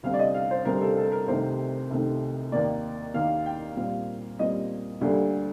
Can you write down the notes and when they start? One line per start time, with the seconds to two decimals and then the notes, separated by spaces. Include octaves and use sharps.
0.03 D2 C3 G3 C4 F5
0.14 D5
0.19 D#5
0.34 F5
0.51 C5
0.65 D2 C3 G3 C4 A#4
0.81 A4
0.97 A4
1.12 A#4
1.27 C2 C3 D#3 A3 D#4 C5
1.90 C2 C3 D#3 A3 D#4
2.52 D#2 D#3 A#3 D5
3.14 D#2 D#3 A#3 F5
3.46 G5
3.76 A#2 G3 C4 F5
4.39 A#2 G3 C4 D#5
5.01 D2 D3 G3 A#3 D4